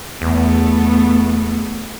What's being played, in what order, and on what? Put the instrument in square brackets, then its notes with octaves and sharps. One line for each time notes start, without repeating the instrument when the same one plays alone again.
[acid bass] E2 [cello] A3 B3